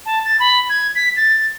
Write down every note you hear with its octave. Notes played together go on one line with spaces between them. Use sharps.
A5
A6
B5
G#6
B6
A6